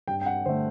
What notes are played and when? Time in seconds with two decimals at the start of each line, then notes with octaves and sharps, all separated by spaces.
0.08 G2 G5
0.21 G5
0.26 F#5
0.45 D3 C5
0.49 A3